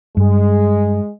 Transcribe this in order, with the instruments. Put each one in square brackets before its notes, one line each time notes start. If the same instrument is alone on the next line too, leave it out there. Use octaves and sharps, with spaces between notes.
[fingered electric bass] G2 [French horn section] G#3